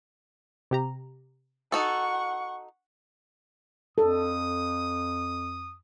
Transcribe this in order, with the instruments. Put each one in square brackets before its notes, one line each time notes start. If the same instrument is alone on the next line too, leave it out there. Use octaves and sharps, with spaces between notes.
[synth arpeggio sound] C3 G4 A#5
[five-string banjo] D#4 F#4 A4 [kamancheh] F#5 C#6
[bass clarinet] F2 [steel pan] A4 [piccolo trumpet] D#6